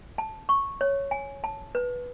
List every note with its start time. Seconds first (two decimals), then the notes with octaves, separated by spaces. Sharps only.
0.18 A5
0.49 C#6
0.81 C#5
1.11 G#5
1.44 A5
1.75 B4